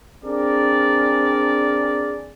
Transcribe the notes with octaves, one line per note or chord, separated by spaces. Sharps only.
C4 D4 G#4 A#4 D5